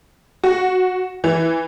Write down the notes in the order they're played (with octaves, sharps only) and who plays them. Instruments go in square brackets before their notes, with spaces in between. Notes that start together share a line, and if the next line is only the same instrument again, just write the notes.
[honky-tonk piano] F#4
E3